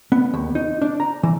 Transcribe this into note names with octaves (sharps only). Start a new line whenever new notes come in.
B3
D#2
D#4
D4
A#5
E3